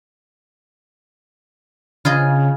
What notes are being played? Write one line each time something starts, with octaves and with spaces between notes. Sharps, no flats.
C#3 F4 G#4 D#5